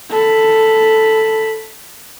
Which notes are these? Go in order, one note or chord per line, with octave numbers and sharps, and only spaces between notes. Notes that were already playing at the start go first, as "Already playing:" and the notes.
A4 B5